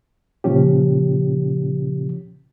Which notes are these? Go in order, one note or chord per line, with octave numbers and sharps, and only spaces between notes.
A#2 C#3 F3 C#4 G4